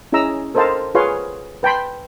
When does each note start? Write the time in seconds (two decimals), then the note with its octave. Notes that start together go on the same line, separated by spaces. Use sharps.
0.12 C#4 E4 G#4 D#5 A#5 E6
0.55 A4 A#4 C5 D#5 F5 A5
0.95 F4 G#4 B4 C#5 F5 C6
1.63 B4 G5 A5 B5 C6